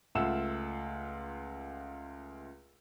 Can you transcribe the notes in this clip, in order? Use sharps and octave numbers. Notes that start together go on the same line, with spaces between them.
C#2 A3 F4 F#5 E6 E7